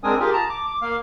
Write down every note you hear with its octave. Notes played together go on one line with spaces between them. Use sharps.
G#3 C4 D4 A#4 G#5 D#6
F4 G4 G#4 A#4
A5 A#5
D6
D6
A#3 F5